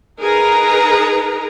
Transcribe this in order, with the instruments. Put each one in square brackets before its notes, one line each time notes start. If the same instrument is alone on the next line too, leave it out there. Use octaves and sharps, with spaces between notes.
[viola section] D#4 G#4 A#4 B4 A#5